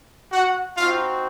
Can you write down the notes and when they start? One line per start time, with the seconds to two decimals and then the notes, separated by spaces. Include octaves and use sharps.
0.32 F#4 F#5
0.76 C4 D#4 F4 F#4 F5